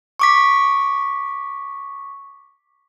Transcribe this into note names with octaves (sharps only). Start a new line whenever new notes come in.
C#6 D6 B6